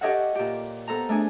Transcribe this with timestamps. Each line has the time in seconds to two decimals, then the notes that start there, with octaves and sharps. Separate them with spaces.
0.01 G4 A4 C#5 D#5 E5 F#5
0.35 A#2 G4
0.88 B3 A4 C5 A#5
1.09 A3 D4 G#4 G#5